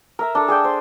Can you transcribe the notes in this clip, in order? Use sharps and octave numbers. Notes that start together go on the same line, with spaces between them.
A#4 E5 A#5
D4 A4
G#4 D5 G5 E6
C5